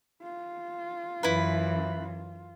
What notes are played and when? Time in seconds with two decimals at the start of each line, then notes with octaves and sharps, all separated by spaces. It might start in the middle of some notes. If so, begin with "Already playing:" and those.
0.22 F4
1.23 F#2 E3 E4 B4